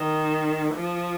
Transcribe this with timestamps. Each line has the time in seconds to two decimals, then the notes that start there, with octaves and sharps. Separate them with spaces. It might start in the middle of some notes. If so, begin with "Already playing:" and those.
Already playing: D#3
0.73 F3